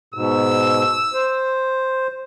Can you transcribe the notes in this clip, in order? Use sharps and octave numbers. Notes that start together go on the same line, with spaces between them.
G#2 B2 E6
C5